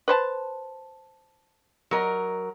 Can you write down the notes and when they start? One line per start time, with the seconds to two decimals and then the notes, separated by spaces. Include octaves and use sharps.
0.08 B4 C5 A5
1.91 F#3 A#4 D#5